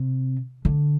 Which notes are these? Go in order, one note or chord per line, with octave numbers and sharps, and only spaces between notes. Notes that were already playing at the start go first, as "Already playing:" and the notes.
Already playing: C3
D3